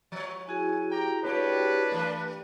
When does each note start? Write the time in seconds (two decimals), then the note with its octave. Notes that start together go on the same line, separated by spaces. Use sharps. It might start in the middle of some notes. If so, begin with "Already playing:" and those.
0.12 F3 C#5
0.48 E4 F#4 G#4 G#5
0.91 G4 G5 A#5
1.23 G2 A#3 D4 G4 B4 C#5
1.92 G2 E3 A3